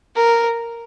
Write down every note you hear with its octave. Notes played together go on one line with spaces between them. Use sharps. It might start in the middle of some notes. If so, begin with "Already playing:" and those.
A#4